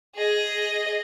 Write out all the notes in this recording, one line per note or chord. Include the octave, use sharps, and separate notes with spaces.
G#4 D#5